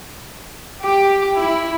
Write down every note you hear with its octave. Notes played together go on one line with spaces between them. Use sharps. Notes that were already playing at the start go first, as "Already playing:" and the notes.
G4
E4